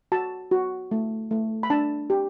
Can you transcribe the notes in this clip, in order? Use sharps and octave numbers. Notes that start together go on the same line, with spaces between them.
F#4 A5
F#4
A3
A3
B5
D4 A5
G4